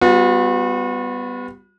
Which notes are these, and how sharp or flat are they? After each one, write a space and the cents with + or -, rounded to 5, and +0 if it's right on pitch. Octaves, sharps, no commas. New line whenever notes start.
G3 +0 B3 +15 F#4 -45